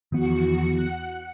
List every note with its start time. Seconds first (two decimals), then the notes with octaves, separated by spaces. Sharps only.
0.12 E2 D#3 F3 B3 F#4 C#7
0.73 F#5